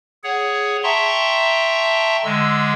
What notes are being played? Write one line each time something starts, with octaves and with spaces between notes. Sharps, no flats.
G#4 C#5 F#5
E5 G5 A5 A#5 C6 C#6
D3 G#3 E6